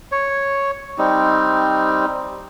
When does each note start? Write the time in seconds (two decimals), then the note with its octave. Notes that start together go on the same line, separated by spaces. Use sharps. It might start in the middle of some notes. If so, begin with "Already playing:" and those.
0.12 C#5
0.98 G3 C4 D#4